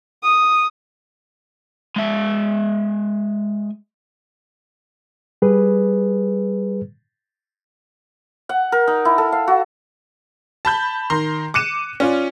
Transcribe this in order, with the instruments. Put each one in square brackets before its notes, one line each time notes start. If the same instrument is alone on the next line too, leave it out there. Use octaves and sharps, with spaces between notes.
[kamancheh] D#6
[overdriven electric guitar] G#3 E5
[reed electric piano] G3 G#4 B4
[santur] F#5
A#4
D#4
E4
A4
F5
F#4
[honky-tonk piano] A5 B5 G6
D#3 A#5 C6
D6 F#6 C#7 D#7 E7
C#4 F4 D5